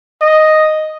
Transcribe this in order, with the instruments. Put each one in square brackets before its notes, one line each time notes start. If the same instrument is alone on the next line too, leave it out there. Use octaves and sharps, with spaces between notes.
[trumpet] D#5